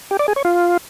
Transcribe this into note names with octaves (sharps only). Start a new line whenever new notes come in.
G4
D5
G#4
C#5
F4